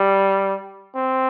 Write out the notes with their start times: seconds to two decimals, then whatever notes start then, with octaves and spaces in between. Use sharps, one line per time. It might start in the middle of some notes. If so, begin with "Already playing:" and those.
Already playing: G3
0.96 C4